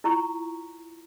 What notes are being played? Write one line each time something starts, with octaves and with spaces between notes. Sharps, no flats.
E4 F4 A#5 C#6